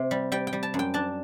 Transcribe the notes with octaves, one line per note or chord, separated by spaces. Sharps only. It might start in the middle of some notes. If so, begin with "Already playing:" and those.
Already playing: C3
G3
G3 G5
G5
G3
A5
F#2
G5
D4 A5